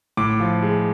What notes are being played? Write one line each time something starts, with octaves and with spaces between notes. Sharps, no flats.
A2 D6
F3
G#3